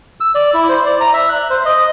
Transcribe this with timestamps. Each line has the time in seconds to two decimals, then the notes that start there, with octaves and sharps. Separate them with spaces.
0.20 E6
0.35 D5
0.54 E4
0.69 C5
0.86 D5
1.01 A#5
1.13 E5
1.29 F#6
1.50 C5
1.66 D#5